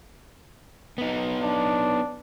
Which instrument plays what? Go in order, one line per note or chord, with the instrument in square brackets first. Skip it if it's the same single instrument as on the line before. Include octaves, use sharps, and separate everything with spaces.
[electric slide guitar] B3 D#4
[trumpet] D4